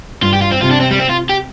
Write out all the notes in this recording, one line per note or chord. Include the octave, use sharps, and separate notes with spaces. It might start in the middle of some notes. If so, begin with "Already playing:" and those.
G2 F4
G4
F4
C4
C3 F4
D4
C4
G3
C4
F4
G4